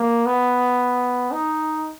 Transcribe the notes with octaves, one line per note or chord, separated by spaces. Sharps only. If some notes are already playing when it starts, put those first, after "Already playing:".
Already playing: A#3
B3
D#4